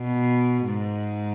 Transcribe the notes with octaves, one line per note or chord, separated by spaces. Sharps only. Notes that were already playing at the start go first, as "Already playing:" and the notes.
Already playing: B2
G#2